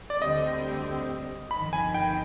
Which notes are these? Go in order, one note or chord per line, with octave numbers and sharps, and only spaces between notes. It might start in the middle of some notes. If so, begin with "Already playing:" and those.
D5
D2 D3 G3 C4 D#5
G1 F2 D#3 B5
G#5
G5